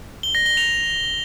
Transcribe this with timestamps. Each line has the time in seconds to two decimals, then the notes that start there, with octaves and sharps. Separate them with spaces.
0.23 G7
0.35 A#6
0.46 G7
0.57 F7